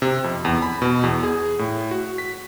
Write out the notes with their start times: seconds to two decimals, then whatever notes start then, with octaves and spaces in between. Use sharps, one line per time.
0.02 C3
0.24 F2
0.45 E2
0.62 B5
0.82 B2
1.03 E2
1.23 G#4
1.59 A2
1.91 F#4
2.18 B6